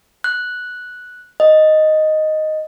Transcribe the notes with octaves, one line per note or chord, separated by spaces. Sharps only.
F#6
D#5